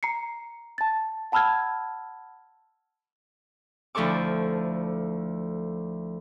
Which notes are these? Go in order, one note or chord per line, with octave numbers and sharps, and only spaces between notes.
A#5 C7 C#7
A5 A6
F#5 A5 B5 E6 F6 G#6
D2 F3 E4 A4 C#6 D6